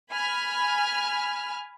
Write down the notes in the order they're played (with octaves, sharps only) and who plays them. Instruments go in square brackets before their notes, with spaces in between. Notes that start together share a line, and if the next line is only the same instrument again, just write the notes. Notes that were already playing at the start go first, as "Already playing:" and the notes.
[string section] G#5 B5 F6